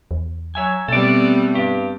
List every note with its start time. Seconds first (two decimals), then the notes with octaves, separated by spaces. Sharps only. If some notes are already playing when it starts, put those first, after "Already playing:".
0.11 E2
0.55 F#3 C#5 E5 G#5
0.88 B2 G3 A3 B3 C4 A4 D5
1.55 G2 G4